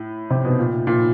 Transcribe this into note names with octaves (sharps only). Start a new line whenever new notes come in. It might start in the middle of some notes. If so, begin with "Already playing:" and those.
Already playing: A2
C3
B2
A#2
A#2